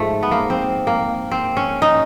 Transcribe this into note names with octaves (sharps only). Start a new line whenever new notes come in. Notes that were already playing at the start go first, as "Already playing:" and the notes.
Already playing: G#2 F3 A3
B3
A#3
C4
A#3
C4
C#4
D#4